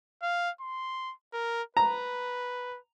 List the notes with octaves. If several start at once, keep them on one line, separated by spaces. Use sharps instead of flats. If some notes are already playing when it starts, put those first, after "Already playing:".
F5
C6
A#4
B4 A#5